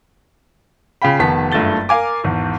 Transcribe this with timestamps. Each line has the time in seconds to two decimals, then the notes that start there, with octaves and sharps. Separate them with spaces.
1.02 C#3 F4 F5 G5 B5
1.19 F1 D#3 B3 A5 B6
1.52 F#1 G2 A3 F4 A6 G7
1.89 A#4 F5 G#5 D6
2.24 G#1 E2